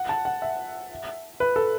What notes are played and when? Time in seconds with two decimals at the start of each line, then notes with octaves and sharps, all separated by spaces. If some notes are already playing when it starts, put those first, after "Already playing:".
Already playing: F#5
0.09 A5
0.25 F#5
0.42 E5
1.40 B4
1.56 A4